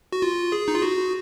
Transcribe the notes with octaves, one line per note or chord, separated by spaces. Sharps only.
F#4
F4
G#4
D#4
F4
F#4